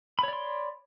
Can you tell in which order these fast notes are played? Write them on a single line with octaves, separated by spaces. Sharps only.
B5 C#5 D5 C6